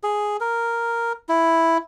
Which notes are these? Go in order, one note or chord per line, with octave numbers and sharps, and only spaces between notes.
G#4
A#4
E4